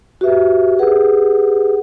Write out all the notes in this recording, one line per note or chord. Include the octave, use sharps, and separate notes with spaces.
F#4 G4 B4 E5
G4 G#4 B4 F#5